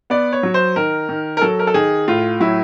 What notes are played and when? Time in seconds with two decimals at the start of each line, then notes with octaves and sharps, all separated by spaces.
0.10 B3 D5
0.33 C#5
0.43 F#3
0.54 C5
0.76 D#3 A#4
1.09 D#3
1.37 A#4
1.42 F#3 A4
1.59 A#4
1.67 A4
1.74 D#3 G#4
2.08 A2 F4
2.40 F#3 E4